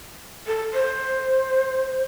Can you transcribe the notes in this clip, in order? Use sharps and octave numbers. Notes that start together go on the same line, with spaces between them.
A4
C5